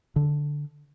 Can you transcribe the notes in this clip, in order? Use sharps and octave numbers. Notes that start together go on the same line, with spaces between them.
D3